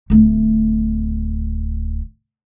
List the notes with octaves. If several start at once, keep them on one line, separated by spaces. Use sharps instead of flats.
D1 A3